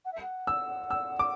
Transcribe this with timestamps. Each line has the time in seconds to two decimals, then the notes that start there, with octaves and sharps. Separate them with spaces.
0.05 F#5
0.13 E5
0.21 F#5
0.47 E6
0.91 E6
1.19 D6